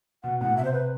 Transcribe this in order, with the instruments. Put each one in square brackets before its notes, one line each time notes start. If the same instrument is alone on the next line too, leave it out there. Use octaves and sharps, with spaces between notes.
[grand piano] B2 [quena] F#5
[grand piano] A2 [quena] F#5
[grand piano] B2
[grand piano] C3 [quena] E5
[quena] C5
B4